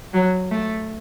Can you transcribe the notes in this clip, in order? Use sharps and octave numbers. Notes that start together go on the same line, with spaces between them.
F#3
A3